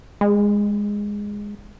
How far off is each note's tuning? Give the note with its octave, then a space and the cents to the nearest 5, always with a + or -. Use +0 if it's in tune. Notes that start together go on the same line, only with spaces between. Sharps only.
G#3 -10